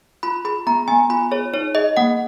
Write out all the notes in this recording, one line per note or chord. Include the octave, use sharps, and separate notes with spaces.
F4 B5
G#4 B5
B3 A#5
B3 G#5
F4 B5
G#4 C#5
D#4 C#5
G#4 D#5
A#3 F#5